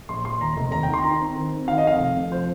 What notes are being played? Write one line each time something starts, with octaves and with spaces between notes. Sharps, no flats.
A#1 C6
A#1 C6
D#2 A#5
F1
D#2 A#5
G5
D#3
C6
D#3 A#5
C4
D#3
C4
D#3 F5
D#5
F2 F5
F1
F2
F3 C5